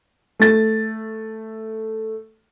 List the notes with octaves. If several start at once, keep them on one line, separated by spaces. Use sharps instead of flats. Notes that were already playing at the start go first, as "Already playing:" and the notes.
A3 A6